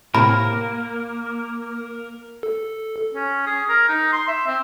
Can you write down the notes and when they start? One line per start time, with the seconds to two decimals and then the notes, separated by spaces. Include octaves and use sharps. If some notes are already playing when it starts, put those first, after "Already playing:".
0.15 A2 C3 A#3 A#4 B5
2.43 A4
3.14 C#4
3.47 G#4
3.69 A#4
3.88 D#4
4.12 C6
4.28 E5
4.47 C4